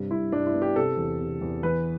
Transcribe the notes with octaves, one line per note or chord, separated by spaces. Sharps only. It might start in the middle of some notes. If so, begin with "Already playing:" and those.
Already playing: G2 C3
G2 E4
G2 D4
E4
B3
G4
C3 A4
E2
C3
E2
E3 B4